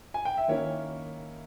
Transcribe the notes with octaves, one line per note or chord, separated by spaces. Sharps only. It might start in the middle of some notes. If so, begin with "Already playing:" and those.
G#5
G5
E5
D#3 A#3 C#4 E4 C#5